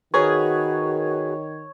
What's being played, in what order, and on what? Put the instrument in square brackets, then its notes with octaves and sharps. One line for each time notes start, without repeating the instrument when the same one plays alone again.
[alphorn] D#3 [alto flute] F#4 [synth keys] G#4 A#4 B4 [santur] C#5